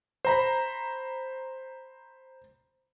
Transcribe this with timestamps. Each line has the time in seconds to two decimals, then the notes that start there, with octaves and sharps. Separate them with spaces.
0.25 C5 A#5 B5